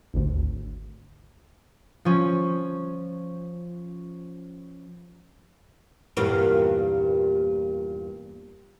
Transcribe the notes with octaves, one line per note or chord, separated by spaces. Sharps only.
G#1 D2
F3 C#4
E2 G2 A#2